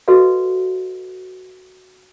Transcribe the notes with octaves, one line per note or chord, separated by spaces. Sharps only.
F#4 A4 B4 D#5 F5